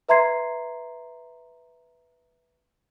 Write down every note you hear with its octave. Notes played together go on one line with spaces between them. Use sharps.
B4 E5 A#5 C6 G#6 C7